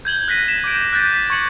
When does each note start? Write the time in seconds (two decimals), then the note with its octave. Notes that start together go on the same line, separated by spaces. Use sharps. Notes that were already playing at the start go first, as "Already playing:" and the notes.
0.05 G6 G#6 F#7 G7
0.28 F#6 A#6 B6 D#7
0.48 E7
0.64 D6 G6 D7
0.93 F#6 G6 A6 B6
1.30 C#6 G#6 C#7 F#7